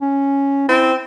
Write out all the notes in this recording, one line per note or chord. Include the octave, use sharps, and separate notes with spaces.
C#4
C4 E4